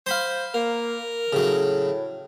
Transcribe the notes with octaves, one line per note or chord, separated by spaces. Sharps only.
C5 F5 B5 C6
A#3 A#4
A2 C#3 F#3